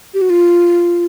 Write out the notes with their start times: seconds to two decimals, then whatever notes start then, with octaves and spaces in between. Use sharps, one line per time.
0.14 G4
0.22 F#4
0.30 F4